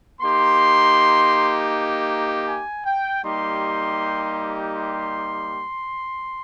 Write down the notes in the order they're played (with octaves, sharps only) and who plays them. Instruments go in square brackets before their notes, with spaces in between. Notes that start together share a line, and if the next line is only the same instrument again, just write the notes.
[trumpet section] A#3 D#4 G4 C6
G#5
G5
G3 A#3 D#4 G4 C6
C6